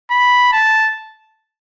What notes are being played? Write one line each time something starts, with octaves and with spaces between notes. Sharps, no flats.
B5
A5